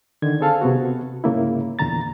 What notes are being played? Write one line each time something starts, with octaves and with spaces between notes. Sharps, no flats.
D3 D#3 G#6
C4 G#4 A4 F5 A5
C3 B3 F#4
G#2 C#3 A#3 E4
E2 A#2 D3 A#5 A6